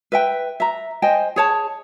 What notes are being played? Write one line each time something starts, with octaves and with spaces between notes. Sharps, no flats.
B4 E5 G5
E5 A#5
C5 D#5 G5 G#5
G#4 C#5 A5